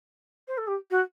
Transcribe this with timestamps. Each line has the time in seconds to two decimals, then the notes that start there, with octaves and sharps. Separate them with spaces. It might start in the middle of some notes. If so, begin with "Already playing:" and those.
0.48 C5
0.57 A4
0.67 G4
0.90 F#4